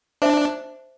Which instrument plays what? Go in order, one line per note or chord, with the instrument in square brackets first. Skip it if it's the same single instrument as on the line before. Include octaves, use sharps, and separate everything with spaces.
[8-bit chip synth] D4 [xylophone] C5 E5 A5